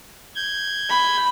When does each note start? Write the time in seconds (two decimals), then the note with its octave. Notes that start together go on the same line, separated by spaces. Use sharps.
0.35 G6 G#6
0.89 B5